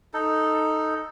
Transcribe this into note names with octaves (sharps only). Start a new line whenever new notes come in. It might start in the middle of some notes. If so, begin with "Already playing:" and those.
D#4 A4